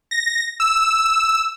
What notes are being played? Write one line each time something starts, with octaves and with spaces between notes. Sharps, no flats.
A#6
E6